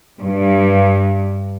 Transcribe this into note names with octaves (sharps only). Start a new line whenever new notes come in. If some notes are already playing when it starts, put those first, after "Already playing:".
G2